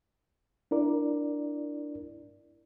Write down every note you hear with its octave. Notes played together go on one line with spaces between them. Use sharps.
D4 E4 A#4 D5